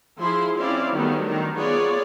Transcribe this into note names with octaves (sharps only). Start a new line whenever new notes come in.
F3 E4 G#4 C6
C4 C#4 E4 D5 F5
D#3 F#3 G3 A3 B3
D#3 D4
B3 F4 G#4 C#5 D5